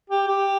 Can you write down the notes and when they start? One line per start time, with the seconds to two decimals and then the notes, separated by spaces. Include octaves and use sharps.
0.10 G4
0.27 G4